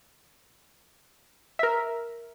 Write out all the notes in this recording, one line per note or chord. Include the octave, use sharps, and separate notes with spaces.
A#4 E5